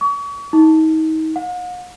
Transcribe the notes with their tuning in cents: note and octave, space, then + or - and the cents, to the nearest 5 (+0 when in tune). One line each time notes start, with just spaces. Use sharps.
C#6 +40
D#4 +30
F#5 -45